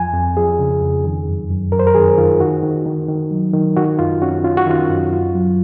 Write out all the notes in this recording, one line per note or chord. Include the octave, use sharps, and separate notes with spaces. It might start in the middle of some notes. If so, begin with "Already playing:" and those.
Already playing: F2 F3 G#5
F2
F3 G#4
C#3
F2
D#3
F#2
F#2
F#2 A#4
C5
A#4
D#3 G#4
D#3 F4
D#3 F#4
D#3
D#3
D#3
F#3
D#3
D#3 F#4
F#2 F4
C#4 F#4
C#4 F4
F#4
D#3 F4
F#2
F4
F#3